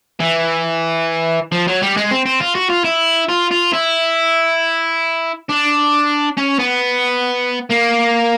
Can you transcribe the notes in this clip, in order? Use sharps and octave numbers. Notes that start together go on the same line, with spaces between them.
E3
F3
F#3
G3
G#3
C4
C4
F4
F#4
F4
E4
F4
F4
E4
D4
C#4
B3
A#3